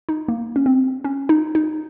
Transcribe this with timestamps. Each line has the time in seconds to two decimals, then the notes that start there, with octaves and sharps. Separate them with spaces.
0.09 D#4
0.28 A#3
0.56 C#4
0.66 C4
1.04 C#4
1.29 D#4
1.55 D#4